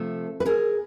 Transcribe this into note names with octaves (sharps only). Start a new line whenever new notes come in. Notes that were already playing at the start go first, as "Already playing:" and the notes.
Already playing: C3 F3 A3 A4
B4
G#4 A#4